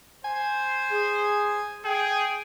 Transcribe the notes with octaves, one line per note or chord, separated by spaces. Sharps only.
C5 G#5
G#4
G#4 G5